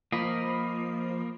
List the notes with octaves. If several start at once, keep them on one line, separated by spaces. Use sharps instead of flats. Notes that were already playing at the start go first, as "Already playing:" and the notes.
F3 A#3 F4 D#5 B5 C7